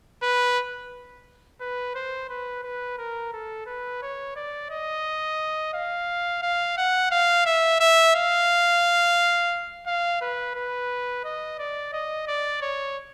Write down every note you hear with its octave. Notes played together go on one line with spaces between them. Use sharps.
B4
B4
C5
B4
B4
A#4
A4
B4
C#5
D5
D#5
F5
F5
F#5
F5
E5
E5
F5
F5
B4
B4
D#5
D5
D#5
D5
C#5